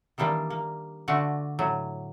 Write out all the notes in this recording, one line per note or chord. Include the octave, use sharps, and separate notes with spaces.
D#3 E3 G3 A#3 D4
A#3
D3 A3 D4 F#4
A2 F#3